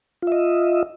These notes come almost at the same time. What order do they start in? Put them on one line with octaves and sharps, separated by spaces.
F4 E5 D#5